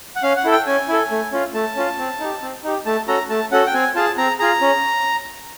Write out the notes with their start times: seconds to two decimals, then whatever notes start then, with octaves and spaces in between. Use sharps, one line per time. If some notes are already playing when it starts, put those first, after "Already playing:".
0.16 F#5
0.23 C#4 F5
0.37 F#5
0.44 E4 A4
0.52 G5
0.67 C#4 G#5
0.88 E4 A4
1.11 A3
1.32 C#4 F4
1.54 A3 A5
1.76 C#4 F4
1.99 C4
2.20 D#4 G4
2.42 C4
2.64 D#4 G4
2.86 A3 A5
3.08 C#4 F#4 A4 A#5
3.30 A3 A5
3.52 C#4 F#4 A4 F#5
3.67 G5
3.74 C4 G#5
3.95 F4 G#4 A5
4.18 C4 A#5
4.39 F4 G#4 A#5
4.61 C#4